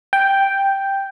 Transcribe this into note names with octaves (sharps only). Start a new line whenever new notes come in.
G5